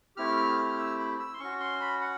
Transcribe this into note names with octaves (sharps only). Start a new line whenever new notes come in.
A3 C4 E4 G4 F6
F6
F6
E6
B5
E6
C6
C#4 F#4 C#6
C6
B5
F#5